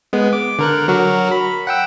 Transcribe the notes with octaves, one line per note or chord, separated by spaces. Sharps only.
G#3 B3
D6
D3 A#4 F#6
F#3 F#4 A#4
B5
F#5 G5 E6